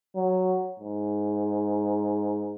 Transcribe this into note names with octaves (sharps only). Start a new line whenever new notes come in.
F#3
G#2